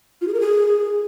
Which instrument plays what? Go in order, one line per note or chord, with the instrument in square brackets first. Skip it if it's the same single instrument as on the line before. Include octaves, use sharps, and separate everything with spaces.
[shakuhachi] F4
G#4
A#4
G#4